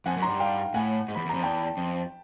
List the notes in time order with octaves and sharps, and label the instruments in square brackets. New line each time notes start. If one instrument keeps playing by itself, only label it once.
[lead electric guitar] F2 [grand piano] F#5 G#5
[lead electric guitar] F#2
[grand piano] A#5 C6
[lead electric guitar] G2
[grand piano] F5 G5
[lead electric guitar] A2 [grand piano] F#5 G#5
[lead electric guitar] G#2
[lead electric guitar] E2 [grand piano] B5
[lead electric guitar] E2
[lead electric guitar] F2 [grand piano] A#5
[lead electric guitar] E2 [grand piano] G5 A5
[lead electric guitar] F2